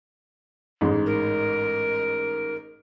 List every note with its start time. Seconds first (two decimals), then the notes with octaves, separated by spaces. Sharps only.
0.81 A1 G#2 G#3
1.06 A#4